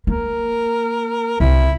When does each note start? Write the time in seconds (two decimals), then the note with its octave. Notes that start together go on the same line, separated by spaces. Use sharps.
0.07 A#3 A#4
1.40 C2 E4